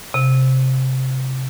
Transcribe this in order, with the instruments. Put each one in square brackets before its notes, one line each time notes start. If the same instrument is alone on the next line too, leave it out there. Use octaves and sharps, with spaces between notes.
[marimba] C3